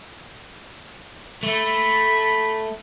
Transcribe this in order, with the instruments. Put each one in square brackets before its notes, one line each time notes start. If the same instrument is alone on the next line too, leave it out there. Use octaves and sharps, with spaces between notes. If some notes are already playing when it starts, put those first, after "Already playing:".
[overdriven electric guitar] A3 [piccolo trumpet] B5